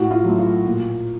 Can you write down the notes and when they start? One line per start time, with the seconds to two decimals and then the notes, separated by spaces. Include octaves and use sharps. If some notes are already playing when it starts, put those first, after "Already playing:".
Already playing: A2 F#4
0.11 F4
0.24 F#3 A3
0.39 F4
0.66 A#2